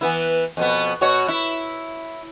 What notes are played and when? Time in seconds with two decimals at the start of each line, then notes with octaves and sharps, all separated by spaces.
0.01 E3 B3 E4
0.57 F2 B2 B3
1.01 B2 F#4 C#5
1.28 E4